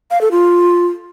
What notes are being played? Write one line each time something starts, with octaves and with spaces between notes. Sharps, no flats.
F5
A4
F4